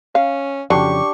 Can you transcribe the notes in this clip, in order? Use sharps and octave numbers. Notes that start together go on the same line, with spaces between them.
C#4 F5
F2 C#3 F#3 D4 G4 C6 C#6